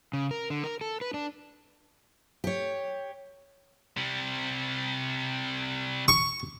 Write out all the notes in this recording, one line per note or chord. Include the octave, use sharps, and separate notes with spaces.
C#3
A#4
D3
A#4
A4
B4
D4
G4 C#5
C3 G3
C#6